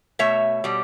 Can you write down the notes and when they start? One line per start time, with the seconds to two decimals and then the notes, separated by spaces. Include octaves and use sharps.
0.19 B2 A3 C#5 E5
0.64 B2 G3